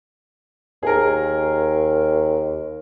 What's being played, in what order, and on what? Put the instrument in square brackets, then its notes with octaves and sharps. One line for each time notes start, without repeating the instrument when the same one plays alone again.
[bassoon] D#2 [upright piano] G#4 A#4